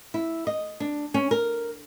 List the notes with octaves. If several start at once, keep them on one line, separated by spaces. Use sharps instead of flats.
E4
D#5
D4
C#4
A#4